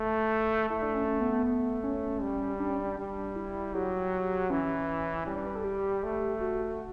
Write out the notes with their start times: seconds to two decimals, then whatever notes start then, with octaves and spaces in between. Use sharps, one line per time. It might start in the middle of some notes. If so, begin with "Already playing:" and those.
Already playing: A3
0.69 A3 E4
0.82 D4
0.94 C#4
1.07 C#4
1.21 B3
1.32 B3
1.46 A3
1.84 C#4
2.22 G3
2.60 D4
2.70 C#4
2.79 D4
2.98 G3
3.36 E4
3.74 F#3 G4
4.50 E3 C#4
5.26 G3 C#4
5.36 D4
5.46 B4
5.55 A4
5.64 G4
6.03 A3
6.40 F#4